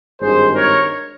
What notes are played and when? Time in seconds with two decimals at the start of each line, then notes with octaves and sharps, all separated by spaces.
0.20 G#1 G2 D#3 G#4 C5
0.55 A#4 C#5